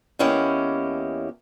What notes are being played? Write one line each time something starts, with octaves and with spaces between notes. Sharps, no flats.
E2 A#3 C#4 E4 G4 D#5